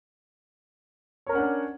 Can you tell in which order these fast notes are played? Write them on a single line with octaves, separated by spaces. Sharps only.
C#5 A#4 C#4 F#5 D4